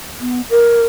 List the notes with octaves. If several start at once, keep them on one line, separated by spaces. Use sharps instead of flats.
B3
A#4